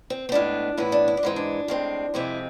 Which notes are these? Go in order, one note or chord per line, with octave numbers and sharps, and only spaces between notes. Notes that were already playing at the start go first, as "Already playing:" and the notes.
C4
C4
A2 G#3 B3 D4
A2 E3 B3 E4
D4
E4
D4
G#2 E3 G#3 C4
D4
A2 G#3 C4
F2 C3 G#3 C4 E4